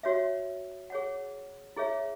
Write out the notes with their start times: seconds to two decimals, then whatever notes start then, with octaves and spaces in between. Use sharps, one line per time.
0.03 F#4 C#5 E5
0.90 G#4 C#5 F#5
1.76 E4 G#4 C#5 E5